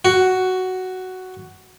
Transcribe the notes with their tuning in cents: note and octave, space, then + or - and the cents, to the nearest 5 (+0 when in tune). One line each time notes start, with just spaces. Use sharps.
F#4 +5